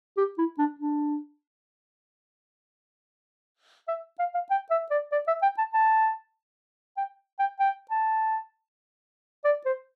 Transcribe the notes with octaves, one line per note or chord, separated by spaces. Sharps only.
G4
E4
D4
D4
E5
F5
F5
G5
E5
D5
D5
E5
G5
A5
A5
G5
G5
G5
A5
D5
C5